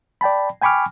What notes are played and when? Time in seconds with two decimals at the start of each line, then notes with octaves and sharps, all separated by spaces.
0.21 D5 G5 A5 B5
0.62 G5 G#5 B5 C#6 D6 F6